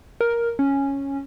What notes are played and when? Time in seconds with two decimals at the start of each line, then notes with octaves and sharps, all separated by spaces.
0.21 A#4
0.59 C#4